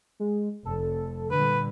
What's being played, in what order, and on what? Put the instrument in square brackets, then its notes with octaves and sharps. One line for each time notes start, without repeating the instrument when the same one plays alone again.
[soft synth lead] G#3
[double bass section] F1 [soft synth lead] A4
[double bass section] A#2 D3 G3 [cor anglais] B4